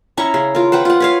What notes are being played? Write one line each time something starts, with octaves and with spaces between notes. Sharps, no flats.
C#4 E4 A#5 C#6
C#3
F4 A#4
B4 C5 F#5 G5
F4 F#5
B4 C#5 F5